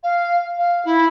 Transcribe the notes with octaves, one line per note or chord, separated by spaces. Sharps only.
F5
F5
E4